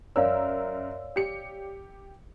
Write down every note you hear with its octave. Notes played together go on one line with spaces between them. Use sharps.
F#2 A#4 C#5 D5 F5 E6
G4 C#7